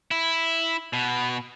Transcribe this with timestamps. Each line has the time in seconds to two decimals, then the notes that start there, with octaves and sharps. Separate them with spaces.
0.11 E4
0.93 B2